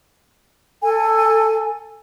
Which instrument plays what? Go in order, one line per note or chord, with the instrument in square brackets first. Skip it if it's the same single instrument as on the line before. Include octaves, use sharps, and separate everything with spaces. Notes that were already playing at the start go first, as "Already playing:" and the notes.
[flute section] A4 G#5